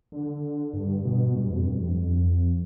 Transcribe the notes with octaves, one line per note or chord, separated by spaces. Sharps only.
D3
G2
B2
G2
G2
F2
G2
F2
F2